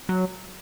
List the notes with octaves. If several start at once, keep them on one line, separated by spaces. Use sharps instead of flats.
F#3